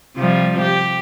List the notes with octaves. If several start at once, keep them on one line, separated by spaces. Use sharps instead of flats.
C3 F3 G3
G4